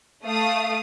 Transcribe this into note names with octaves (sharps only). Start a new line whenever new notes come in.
A3 F5 D#6